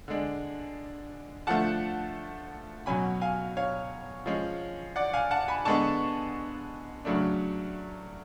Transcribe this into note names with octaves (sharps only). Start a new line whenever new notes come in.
D3 G#3 D4
D3 F3 A3 F#5 A5
B2 F#3 C#4 G#5 B5
F5 G#5
C#5 F5
F3 G#3 C#4
D5 F#5
F5 G#5
F#5 A5
G#5 B5
D3 G#3 B3 A5 C#6
C#3 F#3 A3 D4